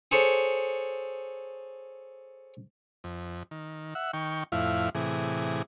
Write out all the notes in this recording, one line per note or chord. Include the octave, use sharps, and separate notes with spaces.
G#4 A4 C5 C#5
F2
D#3
E5 F#5
D#3 G5 C#6
F2 A2 E4 F5
A2 C3 E3 G#4